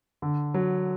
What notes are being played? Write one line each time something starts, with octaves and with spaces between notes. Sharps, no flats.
D3
F#3